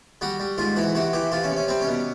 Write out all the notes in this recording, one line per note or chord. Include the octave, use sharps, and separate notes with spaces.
G3 F#4
G3
G#2 F4
E3 F#4
C3 F#4
E3 G4
C3 F4
C#4
C3
C#4
G3 C4
C#4
B2